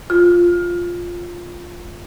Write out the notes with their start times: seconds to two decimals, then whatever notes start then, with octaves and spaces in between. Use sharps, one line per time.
0.10 F4